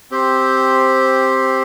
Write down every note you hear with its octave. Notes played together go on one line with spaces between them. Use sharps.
C4 G4 C5